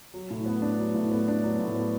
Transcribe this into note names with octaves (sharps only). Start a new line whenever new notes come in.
F#3
A2
B3
D4
F#3
A2
B3
D4
F#3
A2
B3